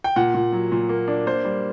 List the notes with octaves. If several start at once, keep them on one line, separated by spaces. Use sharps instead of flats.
G5
A#2 F#5
A#2
F#3
A#2
A#3
D4
A#3 C5
G3